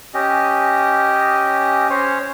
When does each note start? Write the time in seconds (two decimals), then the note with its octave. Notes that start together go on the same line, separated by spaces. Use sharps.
0.14 C#4 G4 D#5
1.90 C#4 C5 C#5